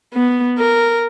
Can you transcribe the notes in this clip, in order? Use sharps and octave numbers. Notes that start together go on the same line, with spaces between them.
B3
A#4